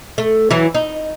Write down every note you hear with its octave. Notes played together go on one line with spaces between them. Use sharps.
A3
E3 F#3 E4
D#4